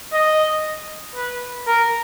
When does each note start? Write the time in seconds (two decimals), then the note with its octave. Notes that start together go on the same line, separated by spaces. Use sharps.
0.13 D#5
1.15 B4
1.67 A#4